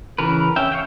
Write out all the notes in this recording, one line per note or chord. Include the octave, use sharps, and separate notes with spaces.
C#3 E3 A#4 B4
C#4 E5 G5
C#5 F5 G5